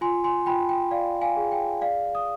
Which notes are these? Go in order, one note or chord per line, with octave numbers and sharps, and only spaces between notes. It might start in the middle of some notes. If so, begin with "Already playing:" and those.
F4 G#5 C6
G#5 C6
F4 G5 B5
G5
D5 F5
F5 G#5
G#4
G5
D5 F5
D#6